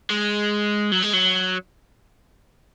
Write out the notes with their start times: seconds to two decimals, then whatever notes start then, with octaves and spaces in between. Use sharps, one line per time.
0.10 G#3
0.92 F#3
1.03 G#3
1.13 F#3